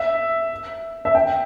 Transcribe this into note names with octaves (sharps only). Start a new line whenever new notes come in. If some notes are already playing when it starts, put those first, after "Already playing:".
Already playing: E5
E5
G5